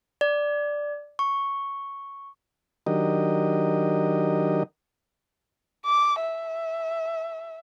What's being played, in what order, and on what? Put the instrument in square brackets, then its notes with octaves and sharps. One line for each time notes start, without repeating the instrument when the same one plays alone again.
[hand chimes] D5
C#6
[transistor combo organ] D#3 F#3 D4 G4 A#4 D#5
[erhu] D6
E5